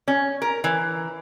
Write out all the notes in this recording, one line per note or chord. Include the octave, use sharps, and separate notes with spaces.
C#4
A#4
E3